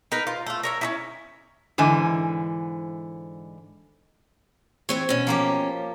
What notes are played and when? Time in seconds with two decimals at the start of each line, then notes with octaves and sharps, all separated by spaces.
0.12 D#4 A#4 B4
0.27 F4
0.47 A3 F4
0.63 A#4 C#5 E5
0.81 C#4 D#4 E4
1.78 G#2 D3 E3 G#5
4.89 E3 C4 C5 C#5
5.09 B2 C#4
5.27 F3 A#3 G4